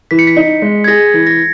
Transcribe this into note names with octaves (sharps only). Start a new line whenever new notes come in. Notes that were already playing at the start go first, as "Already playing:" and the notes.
E3 B6
C#7
B6
D#4
G#3
G#6
G#4 A#6
E3
A#6